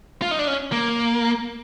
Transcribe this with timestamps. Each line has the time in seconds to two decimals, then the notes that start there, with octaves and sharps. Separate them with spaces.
0.22 F4
0.31 D#4
0.39 D4
0.47 C#4
0.72 A#3